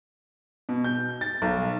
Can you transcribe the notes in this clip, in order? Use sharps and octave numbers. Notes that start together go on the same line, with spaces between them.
B2
G6
A6
B1